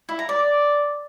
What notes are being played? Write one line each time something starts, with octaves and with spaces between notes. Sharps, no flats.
E4
A#5
D5